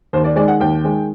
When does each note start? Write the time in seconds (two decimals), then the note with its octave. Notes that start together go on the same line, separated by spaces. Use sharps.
0.13 D#2 C5
0.24 D5
0.36 D#3 G#3 D5
0.48 F#5
0.60 D#2 G5
0.84 D#3 G#3